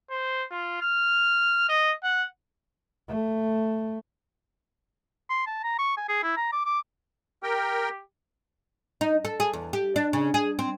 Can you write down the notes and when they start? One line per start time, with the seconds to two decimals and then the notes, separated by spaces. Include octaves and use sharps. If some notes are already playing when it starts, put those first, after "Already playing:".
0.10 C5
0.51 F4
0.82 F6
1.69 D#5
2.04 F#5
3.09 A3
5.29 C6
5.47 A5
5.64 A#5
5.79 C#6
5.97 G#5
6.09 G#4
6.23 E4
6.37 A#5
6.52 D6
6.66 D6
7.43 G4 A#4 G5
9.01 D#4
9.25 A4
9.40 G#4
9.53 E2
9.73 G4
9.96 D4
10.13 C#3
10.34 G#4
10.59 C4